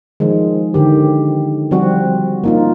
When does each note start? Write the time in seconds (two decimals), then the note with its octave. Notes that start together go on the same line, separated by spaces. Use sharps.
0.20 D#3 F3 G#3
0.74 D3 D#3 G4
1.71 F3 G3 C4 F#4
2.44 A#3 D#4 F4